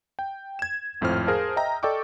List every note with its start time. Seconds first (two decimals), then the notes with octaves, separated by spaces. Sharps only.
0.19 G5
0.59 G#6 E7
1.01 G#1 F2 A2 F4 C5 F6
1.27 G#4 A#4 C5 F5 A5
1.56 D#5 E5 G5 A#5
1.83 A4 D5 D#5 G5 C#6 D6